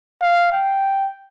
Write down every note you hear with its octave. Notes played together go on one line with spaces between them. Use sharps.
F5
G5